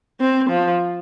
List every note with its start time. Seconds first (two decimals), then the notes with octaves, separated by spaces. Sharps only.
0.20 C4
0.50 F3